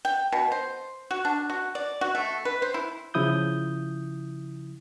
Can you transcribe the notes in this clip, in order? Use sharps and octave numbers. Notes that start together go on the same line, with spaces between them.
G5
B2
C5
F#4
D4
F#4
D5
F#4
A3
B4
C5
E4
C#3 F3 E4 D#6 G6